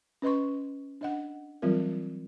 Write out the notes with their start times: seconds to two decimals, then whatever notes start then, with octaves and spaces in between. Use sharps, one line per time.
0.22 C#4 B4 D#5 C6 C#6
1.01 D4 D#5 F#5
1.62 E3 F#3 G3 C4 F4 A#4